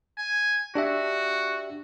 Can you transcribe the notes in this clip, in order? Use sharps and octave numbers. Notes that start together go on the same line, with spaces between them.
G#5
D4 F#4 G4 E5